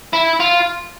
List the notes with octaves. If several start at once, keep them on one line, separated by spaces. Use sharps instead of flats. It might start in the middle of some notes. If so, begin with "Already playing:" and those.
E4
F4